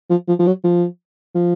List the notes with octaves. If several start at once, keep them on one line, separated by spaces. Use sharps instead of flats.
F3
F3
F3
F#3
F3
F3